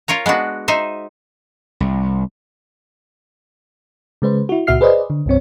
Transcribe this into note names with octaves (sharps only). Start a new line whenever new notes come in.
F4 A#4 C#5 A#5
G#3 B3 D4 F#4
D#4 C5 E5
C2
C#3 G#3 B4 C5
E4 F#4
C#2 A#2 F#4 E5 F6 C7
G#4 B4 C5 D5 D#5
D3
C2 G2 C4 C#5